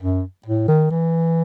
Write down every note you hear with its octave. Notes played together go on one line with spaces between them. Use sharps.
F#2
A2
D#3
E3